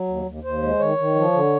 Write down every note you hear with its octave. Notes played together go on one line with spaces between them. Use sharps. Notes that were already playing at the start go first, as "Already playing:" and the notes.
Already playing: F#3
D#2
D#2
D#2 C5
G#3
D#3 C#5
D#3
F3
D3